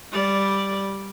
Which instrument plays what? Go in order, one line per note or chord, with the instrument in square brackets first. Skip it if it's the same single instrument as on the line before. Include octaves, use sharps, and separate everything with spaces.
[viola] G3 D5